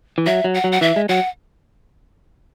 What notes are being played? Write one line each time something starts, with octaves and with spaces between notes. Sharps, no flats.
E3
F#3 E5
F#3
F#5
F#3
F#5
E3 E5
G#3
F#3 F#5